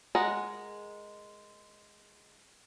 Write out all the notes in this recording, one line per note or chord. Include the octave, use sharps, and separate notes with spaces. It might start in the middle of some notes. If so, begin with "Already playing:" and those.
G#3 A#4 D#5 F#5